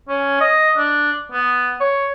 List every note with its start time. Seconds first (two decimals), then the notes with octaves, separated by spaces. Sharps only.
0.09 C#4
0.41 D#5
0.78 D4
1.32 B3
1.81 C#5